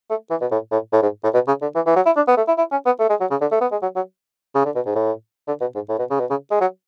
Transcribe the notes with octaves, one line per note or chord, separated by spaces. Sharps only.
A3
E3
B2
A2
A2
A2
G#2
A2
B2
C#3
D3
E3
E3
F#3
E4
D4
B3
A3
E4
E4
C#4
B3
A3
G#3
F#3
C#3
D3
A3
B3
G#3
F#3
F#3
C#3
D3
B2
G#2
A2
D3
B2
G#2
A2
B2
C#3
B2
C#3
G#3
F#3